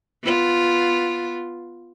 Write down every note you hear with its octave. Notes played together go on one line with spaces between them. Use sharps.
B3 F4